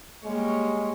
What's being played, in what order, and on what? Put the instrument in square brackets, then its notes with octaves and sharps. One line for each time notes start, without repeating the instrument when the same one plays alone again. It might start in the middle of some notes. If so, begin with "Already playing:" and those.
[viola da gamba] G3 A#3 C#5 [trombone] G#3